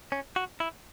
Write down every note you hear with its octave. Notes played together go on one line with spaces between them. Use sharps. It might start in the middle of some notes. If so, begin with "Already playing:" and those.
C#4
F#4
E4